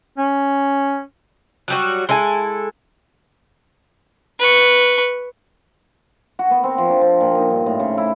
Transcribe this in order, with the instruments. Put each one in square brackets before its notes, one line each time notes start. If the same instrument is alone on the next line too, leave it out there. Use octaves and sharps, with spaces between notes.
[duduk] C#4
[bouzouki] F#3 G3 F#4
G#3 E4 A4 G#5
[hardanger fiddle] B4 C#6
[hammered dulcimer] F#4
B3
C4
F3
D4
C4
A#2
D#4
G2
A2
C#3
E4